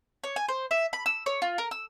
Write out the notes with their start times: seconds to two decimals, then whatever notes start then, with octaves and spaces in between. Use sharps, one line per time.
0.24 C#5
0.36 G#5
0.49 C5
0.71 E5
0.93 B5
1.06 E6
1.26 C#5
1.42 F4
1.58 A#4
1.71 E6